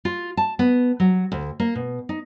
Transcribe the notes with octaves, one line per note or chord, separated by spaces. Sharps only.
F4
A5
B3
F#3
D2
A#3
B2
D#4